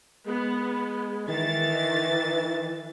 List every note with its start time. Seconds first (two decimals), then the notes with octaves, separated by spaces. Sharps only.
0.27 G#3 B3
1.28 D#3 E3 A6